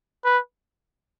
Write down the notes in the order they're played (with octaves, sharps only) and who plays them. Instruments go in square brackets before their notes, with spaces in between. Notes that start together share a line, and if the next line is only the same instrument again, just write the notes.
[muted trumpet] B4